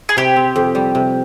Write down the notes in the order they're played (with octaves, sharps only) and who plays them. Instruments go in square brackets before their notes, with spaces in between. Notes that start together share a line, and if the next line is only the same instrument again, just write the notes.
[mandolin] G#4
[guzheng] C3 [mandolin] G4
[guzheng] C4
F2
G3
C3